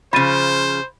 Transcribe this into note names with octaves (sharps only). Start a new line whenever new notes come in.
C#3 F3 C5 B5 A6 D#7